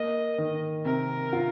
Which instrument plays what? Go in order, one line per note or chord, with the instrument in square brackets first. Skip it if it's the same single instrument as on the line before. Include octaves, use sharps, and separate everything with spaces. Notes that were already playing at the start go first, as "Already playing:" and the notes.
Already playing: [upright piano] A#3 [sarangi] D#5
[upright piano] D#3
[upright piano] C3 [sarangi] A#4
[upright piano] F4